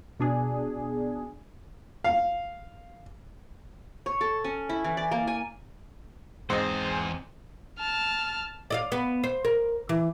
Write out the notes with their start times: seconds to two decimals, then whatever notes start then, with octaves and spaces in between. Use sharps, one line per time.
0.20 B2 D4 G#4
2.04 F5
4.06 C#5
4.21 A4
4.44 C#4
4.69 E4
4.84 E3
4.97 D5
5.11 A#3
5.27 G#5
6.50 E2 G#2 C4 C5 D#5 G#5
7.79 A5 F6
8.70 D5 D#5 F5
8.92 B3
9.24 C5
9.45 A#4
9.89 E3